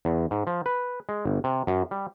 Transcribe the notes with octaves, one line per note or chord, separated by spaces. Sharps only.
E2
G#2
F3
B4
G#3
G1
C3
F#2
G3